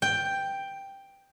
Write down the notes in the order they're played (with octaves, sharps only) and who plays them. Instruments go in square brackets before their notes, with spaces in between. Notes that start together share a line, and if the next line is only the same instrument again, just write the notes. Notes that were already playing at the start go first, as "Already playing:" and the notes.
[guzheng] G5